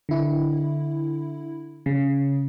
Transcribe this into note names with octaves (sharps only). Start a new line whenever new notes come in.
D3 E4
C#3